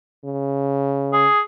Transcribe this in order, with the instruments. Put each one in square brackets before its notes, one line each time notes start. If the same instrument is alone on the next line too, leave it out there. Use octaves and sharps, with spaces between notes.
[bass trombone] C#3
[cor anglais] G#4